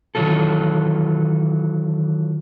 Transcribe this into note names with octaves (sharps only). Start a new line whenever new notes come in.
D#3 E3 F#3 F4 A4